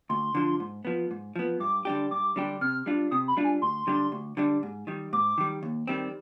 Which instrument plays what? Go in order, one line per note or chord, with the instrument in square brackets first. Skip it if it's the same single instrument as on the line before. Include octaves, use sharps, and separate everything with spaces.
[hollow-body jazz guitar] D2 [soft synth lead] C6
[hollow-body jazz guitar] D3 F3
G#2
F3 B3
G#2
F3 B3
[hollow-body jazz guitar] G2 [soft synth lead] D6
[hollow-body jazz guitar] D3 G3 D4 G4
[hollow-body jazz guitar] G2 [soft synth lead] D6
[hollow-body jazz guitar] D3 G3 D4 G4
[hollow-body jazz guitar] C3 [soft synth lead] F6
[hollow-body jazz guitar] G3 D4 F4
[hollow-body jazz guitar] C3 [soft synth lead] D#6
[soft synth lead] B5
[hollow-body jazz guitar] G3 D4 F4
[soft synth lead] G#5
[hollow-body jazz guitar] D2 [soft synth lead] C6
[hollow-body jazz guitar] D3 G3 D4
D2
D3 G3 D4
G#2
D#3 G3
[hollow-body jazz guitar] G#2 [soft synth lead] D6
[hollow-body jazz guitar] D#3 G3
D#2
D#3 G3 C4